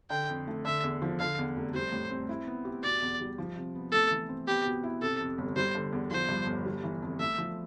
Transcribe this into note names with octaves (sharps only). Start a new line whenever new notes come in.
D3 G5
F2
A3
D3 E5
E2
F3
D3 F5
E2
F1
G3 C5
A2
C4
E4
B3
G4
B2 D5
E2
G3
F3
C3
B3
A3 A4
E3
C4
B3 G4
B2
E4
C3 A4
F2
G1
G3 C5
D3
E2
F3 C5
G2
G1
G3
E3
F2
A3 E5
F3